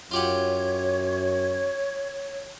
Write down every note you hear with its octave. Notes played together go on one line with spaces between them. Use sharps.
F#2 F4 G4 C#5 F#5